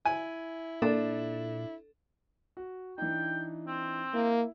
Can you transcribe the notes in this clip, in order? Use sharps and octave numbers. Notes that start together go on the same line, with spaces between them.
E4 G#5
A#2 D4 A4
F#4
E3 D4 D#4 G5
C4
A#3 E4